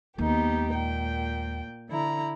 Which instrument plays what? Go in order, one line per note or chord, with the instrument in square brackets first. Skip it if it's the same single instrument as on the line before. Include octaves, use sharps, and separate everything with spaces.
[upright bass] D#2 G#3 [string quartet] B3 D#4 G4
[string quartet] A#2 G5
D3 E4 A#5